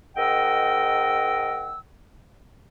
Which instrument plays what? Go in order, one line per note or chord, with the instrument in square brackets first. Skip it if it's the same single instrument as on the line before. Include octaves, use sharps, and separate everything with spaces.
[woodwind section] G#2 A#4 D#5 F#5 G5 E6